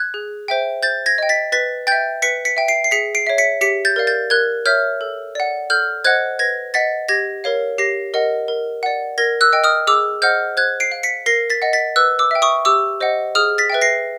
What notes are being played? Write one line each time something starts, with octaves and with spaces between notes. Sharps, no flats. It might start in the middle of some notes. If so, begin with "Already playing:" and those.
Already playing: F#6 G#6
G#4
C5 E5 G5
C5 G6 A6
G#6 A#6
D#5 G5
A6 B6
B4 A6 B6
E5 G5 G6 A6
B4 B6 C#7
B6 C#7
E5 G5
C7 D7
C7
G#4 B6 C#7
C7 D7
C#5 E5
B6 C#7
G4 B6 C#7
G6 A6
A#4 D5 F5
G6 A6
A#4 F#6 G#6
C#5 E5 F6 G6
A4
D5 F#5
A4 F6 G6
C5 D#5 F#5 F#6 G#6
B4 G#6 A#6
D#5 F#5 A6 B6
G4 G#6 A#6
A#4 C#5 F5
G4 A#6 C7
A#4 D#5 F#5
A#4
D5 F#5
A#4 G#6 A#6
E6 F#6
D#5 G5
D#6 F6
G#4 D6 E6
C5 D#5 F#5 F6 G6
C5 F#6 G#6
C7 D7
F5
B6 C#7
A#4 A#6 C7
A6 B6
D#5 F#5
A6 B6
B4 E6 F#6
D6 E6
E5 G5
C#6 D#6
G4 D6 E6
C5 D#5 F#5
G#4 D#6 F6
A6 B6
B4 E5 G5
A#6 C7